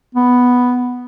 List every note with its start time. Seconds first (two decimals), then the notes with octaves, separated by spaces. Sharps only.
0.15 B3